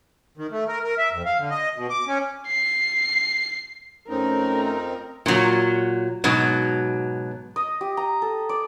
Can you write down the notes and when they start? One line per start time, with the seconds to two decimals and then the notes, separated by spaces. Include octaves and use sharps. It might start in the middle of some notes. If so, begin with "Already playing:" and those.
0.38 D#3
0.52 A3
0.68 A#4
0.84 A#4
0.98 E5
1.12 F2
1.26 F5
1.38 D3
1.51 D#5
1.76 B2
1.90 D6
2.07 C#4
2.47 C7
4.09 F2 A3 C4 C#4 D#4 A#4
5.26 A#2 F#3
6.24 G#2 B2 F#3
7.56 D#5
7.81 G4
7.97 A#5
8.22 A4
8.49 D5